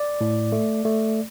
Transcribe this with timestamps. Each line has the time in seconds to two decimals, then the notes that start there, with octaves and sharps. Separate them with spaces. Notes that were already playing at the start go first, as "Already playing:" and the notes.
Already playing: D5
0.21 A2
0.52 A3
0.85 A3